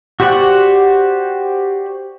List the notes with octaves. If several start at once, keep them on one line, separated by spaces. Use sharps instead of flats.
F#4 G4 C5 D5 F#5